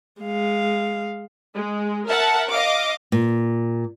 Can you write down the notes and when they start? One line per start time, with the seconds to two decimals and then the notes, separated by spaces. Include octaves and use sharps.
0.22 G#3 F5
1.54 G#3
2.08 A#4 E5 F#5 A5
2.49 D#5 F5 D6
3.12 A#2